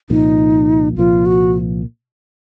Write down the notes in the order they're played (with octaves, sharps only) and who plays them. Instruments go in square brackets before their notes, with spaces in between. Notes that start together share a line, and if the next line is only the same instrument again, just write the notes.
[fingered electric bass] C2 A#2 F3 [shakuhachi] D#4
[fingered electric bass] C2 A#2 F3 [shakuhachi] F4
[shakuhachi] F#4